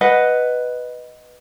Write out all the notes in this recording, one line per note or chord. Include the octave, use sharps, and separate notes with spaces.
B4 D#5 F#5